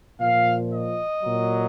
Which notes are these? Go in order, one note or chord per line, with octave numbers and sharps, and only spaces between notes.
A#2 F3 F5
D#5
A#2 F#3